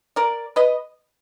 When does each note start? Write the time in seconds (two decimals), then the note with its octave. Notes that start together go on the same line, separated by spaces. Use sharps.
0.16 A#4 D5
0.56 B4 D#5